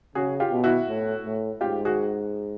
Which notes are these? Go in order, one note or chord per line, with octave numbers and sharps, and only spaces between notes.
C#3 F#4 G#4
F4 G4
B2
E4 F#4
A2
A2
G#2 F4 G4
F#4 G#4